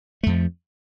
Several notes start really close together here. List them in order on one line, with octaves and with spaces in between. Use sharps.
A3 F2 F3